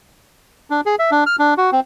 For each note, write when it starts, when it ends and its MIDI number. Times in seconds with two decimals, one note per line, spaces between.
0.70 0.81 62
0.86 0.95 68
0.99 1.11 76
1.11 1.24 62
1.26 1.36 89
1.39 1.54 62
1.58 1.70 66
1.72 1.80 60